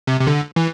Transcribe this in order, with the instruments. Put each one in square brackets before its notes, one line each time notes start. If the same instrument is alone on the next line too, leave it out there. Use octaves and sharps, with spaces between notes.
[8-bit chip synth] C3
C3
D3
E3